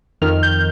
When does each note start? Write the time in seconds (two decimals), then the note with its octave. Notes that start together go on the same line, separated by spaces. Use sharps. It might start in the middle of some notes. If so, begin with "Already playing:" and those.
0.22 F2 D#3 F6
0.43 G6